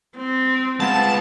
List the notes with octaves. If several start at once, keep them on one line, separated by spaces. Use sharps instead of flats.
C4
G#3 B3 F4 A5